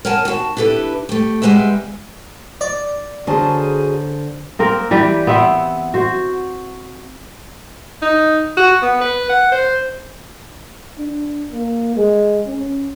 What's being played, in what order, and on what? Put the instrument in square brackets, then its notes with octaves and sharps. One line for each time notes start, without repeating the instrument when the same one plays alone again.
[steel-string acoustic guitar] A#4 C#5 F#5 G#5 A5
D#2 F#4 G5 A5
D4 E4 G4 A4 B4
A3 G4
G3 G#3 B3 B4 E5
[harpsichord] D5
[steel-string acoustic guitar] D3 C5 A5 [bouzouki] F#3 G#4 A#4
[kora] A#3 C4 A#4
E3 G3 G4 B4
B3 C4 E5 F#5
F#4 C5
[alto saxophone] D#4
F#4
B3
B4
F#5
C5
[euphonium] D4
A#3
G#3
C#4